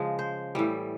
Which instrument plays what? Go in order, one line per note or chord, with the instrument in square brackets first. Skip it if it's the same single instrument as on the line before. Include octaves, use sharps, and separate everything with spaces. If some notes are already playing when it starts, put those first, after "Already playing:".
Already playing: [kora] C#3 F3 G#3
C5
A2 E3 G3